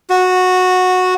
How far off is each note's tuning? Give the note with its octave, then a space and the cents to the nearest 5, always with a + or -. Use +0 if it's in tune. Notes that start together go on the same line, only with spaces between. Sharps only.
F#4 -10